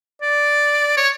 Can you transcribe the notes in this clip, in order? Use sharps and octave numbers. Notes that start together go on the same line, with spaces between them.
D5
C#5